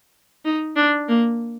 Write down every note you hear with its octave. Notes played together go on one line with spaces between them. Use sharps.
D#4
D4
A#3